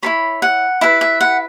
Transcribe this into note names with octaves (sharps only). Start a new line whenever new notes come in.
E4 A4 C#5 B5
F#5
E4 B4 E5
E5
F#5